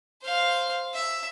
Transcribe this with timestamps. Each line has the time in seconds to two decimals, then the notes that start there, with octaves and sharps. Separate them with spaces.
0.22 C5 F5
0.94 E5